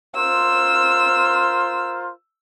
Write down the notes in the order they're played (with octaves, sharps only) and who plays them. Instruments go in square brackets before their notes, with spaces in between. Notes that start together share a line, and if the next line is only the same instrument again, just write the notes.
[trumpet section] F4 A#4 C5 [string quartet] E6